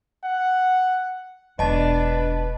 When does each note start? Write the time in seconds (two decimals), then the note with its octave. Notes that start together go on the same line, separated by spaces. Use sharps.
0.24 F#5
1.59 E1 D4 B4 D#5 A5